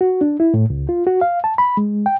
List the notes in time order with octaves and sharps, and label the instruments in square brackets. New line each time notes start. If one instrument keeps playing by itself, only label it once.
[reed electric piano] F#4
D4
E4
A2
C#2
F4
F#4
F5
A5
B5
G#3
G5